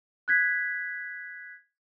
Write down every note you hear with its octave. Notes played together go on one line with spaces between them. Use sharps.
F#6 G#6 B6